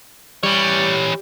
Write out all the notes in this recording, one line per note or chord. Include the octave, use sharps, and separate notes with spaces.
E3 G3 C#5